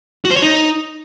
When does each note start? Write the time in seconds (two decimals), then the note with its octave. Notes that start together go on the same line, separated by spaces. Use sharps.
0.25 F#4
0.31 C5
0.36 C#5
0.42 D#4